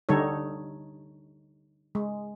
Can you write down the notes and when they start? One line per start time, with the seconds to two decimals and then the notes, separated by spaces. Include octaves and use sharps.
0.09 D3 G3 D#4 A4 C#5
1.95 G#3